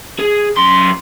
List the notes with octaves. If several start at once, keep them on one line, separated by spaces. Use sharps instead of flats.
G#4
F#2 C6